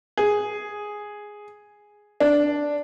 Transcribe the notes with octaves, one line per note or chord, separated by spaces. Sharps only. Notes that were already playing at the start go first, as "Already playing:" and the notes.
G#4
D4